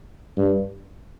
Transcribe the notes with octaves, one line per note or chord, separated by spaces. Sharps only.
G2